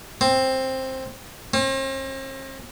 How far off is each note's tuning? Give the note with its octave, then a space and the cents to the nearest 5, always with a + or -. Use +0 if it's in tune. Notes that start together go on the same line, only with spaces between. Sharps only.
C4 +10
C4 +45